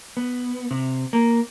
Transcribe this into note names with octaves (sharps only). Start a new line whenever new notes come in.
B3
C3
A#3